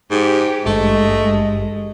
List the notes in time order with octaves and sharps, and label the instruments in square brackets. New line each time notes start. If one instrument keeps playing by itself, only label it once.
[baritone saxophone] G#2 [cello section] G4
[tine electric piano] G#1 G2 G4 [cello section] G#3 [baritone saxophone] A3 [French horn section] D#5